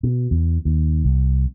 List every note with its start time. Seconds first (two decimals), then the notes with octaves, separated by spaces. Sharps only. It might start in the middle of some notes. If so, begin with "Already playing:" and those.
0.03 B2
0.31 E2
0.65 D#2
1.04 C2